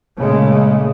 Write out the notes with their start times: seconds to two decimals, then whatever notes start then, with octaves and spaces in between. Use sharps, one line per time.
0.17 A#2 C#3 G#3 A3